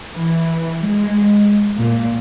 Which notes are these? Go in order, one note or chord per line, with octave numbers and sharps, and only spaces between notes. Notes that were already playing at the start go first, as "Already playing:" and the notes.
E3
G#3
A#2